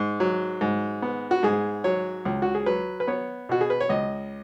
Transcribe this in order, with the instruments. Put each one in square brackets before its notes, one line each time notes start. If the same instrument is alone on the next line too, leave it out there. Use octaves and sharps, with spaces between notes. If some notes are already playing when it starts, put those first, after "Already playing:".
Already playing: [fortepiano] G#2
F#3
G#2
B3
F#4
G#2 G#4
F#3 C#5
C#2
F#4
G#4
F#3 B4
B4
B3 C#5
B2 F#4
G#4
B4
C#5
C#2 D#5